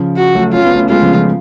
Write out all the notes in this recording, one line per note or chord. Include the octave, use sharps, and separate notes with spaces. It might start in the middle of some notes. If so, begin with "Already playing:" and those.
Already playing: C#3 F3
F#4
F#3 A3
C#4 F4
B3
A3 C#4
G#3 B3 F4
C#3 F3
C#3 F3